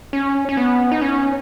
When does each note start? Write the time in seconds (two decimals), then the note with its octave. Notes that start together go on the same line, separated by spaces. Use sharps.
0.13 C#4
0.49 C#4
0.57 B3
0.91 D#4
1.01 C#4